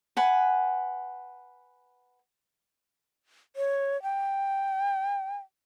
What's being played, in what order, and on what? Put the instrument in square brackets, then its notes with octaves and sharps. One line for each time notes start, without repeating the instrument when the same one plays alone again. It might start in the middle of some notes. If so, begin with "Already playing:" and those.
[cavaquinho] B4 F#5 G#5
[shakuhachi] C#5
G5